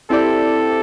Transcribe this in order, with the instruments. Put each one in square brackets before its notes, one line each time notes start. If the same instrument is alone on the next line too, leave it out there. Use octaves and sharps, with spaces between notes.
[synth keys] C4 E4 G4 D5 [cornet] A4